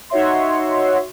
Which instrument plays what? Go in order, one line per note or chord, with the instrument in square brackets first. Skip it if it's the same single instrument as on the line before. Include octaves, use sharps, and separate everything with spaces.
[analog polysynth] D#4 F#4 C#5 E5 C6